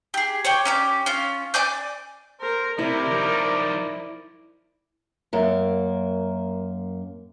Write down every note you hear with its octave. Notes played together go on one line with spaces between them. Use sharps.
G4 G#4
C#5 D5 G5
C#4 G4 D6
C#4 F4
D5 G#5 D6 G6
A#4 C5
C3 E4 A#4 D5
F3 D#4
F#2 A#3